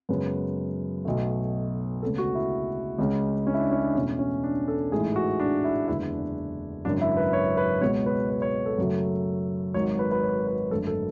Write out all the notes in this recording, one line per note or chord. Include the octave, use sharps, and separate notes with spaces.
F#2 C#3 G#3 B3 B4
B1 B2 A3
D2 C#3 G#3 B3 A4
F#4
E4
C#2 C#3 G#3
C#4
E4
D4
C#4
D4
E2 B2 A3 C#4
C#4
D4
A4
A1 G#2 E3 A3 G#4
F#4
D4
E4
F#1 E2 D3 G#3 B3 E4
D4
G#1 F#2 C#3 D4
E4
B4
C#5
B4
C#2 B2 G#3 B3 C#5
B4
B4
C#5
A4
F#2 C#3 F#3 A3
G#1 G#2 F#3 C#5
B4
B4
C#5
B4
G#1 F#2 D3 A3 A4
A4